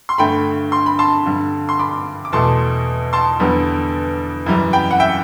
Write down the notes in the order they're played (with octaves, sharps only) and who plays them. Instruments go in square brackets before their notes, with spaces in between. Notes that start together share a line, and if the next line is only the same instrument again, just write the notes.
[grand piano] C6
G2 D3 A3 G5 B5
C6
B5
A5 C6
G2 D3 G3
C6
B5 D6
D6
E2 B2 A3 A5 C6
A5 C6
E2 D3 G3 B3
F#2 E3 G3
G5 B5
F#5
E5 G5